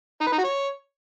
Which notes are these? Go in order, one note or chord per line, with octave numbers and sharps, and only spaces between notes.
D#4
B4
D#4
F#4
C#5